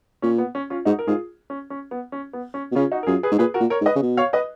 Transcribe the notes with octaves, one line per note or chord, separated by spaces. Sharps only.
A#2 C#4
B3
C#4
C#4 F4
G#2 D#4 F#4
A#4
G#2 F4 G#4
C#4
C#4
B3
C#4
B3
C#4
B2
C#3 C#4 F4
D#4 F#4
A#4
F#2 F4 G#4
G#4 B4
G#2
A#2 G#4 B4
F#4 A#4
A#2
A#4 C#5
G#2
B4 D#5
C#3
B2
C#5 F5
B4 D#5